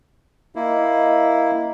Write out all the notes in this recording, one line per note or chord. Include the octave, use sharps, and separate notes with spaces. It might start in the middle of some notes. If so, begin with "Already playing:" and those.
A#3 E4 D#5